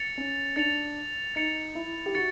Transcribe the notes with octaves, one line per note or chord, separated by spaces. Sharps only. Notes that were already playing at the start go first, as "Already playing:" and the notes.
Already playing: A6 C#7 F7
C#4
D4 A6 C#7 F7
D#4 A6 C#7 F7
E4
G4
F#4 A6 C#7